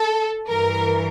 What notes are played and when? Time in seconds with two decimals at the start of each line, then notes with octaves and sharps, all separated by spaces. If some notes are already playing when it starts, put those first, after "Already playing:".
Already playing: A4
0.49 G2 E3 A#4